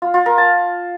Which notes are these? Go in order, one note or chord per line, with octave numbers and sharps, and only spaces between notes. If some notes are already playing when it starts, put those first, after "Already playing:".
F4
F4
A#4
A5